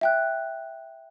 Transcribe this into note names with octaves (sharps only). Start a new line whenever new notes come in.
E5 G5 F#6